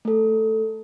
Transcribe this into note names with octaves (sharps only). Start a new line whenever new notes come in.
A3 A4